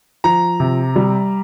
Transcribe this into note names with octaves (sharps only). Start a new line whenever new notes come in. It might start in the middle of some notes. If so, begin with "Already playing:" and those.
F3 A#5
C3
G3